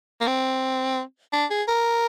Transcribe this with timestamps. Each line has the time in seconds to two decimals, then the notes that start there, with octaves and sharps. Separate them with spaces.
0.21 A#3
0.27 C4
1.33 D4
1.50 G#4
1.68 A#4